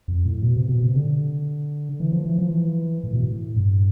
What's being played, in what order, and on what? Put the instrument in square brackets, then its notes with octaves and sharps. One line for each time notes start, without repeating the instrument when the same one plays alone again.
[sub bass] F2
A2
B2
C3
B2
C3
D3
E3
F3
E3
F3
E3
A2
B2
A2
G2